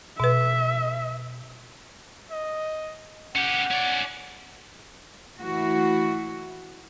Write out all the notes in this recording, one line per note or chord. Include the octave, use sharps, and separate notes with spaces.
B2 B4 E5
D#5
C#4 G4 F#5
C#4 D5
E3 A3 E4 F#4